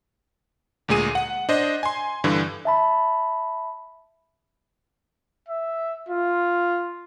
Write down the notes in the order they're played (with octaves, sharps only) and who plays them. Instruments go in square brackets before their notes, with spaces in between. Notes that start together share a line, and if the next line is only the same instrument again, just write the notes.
[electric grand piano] D2 A#2 G#3 G#4 D#7
F#5
D4 C5 D#5
G#5 C6
G2 D3 E3
[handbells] E5 A5 B5
[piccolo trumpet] E5
F4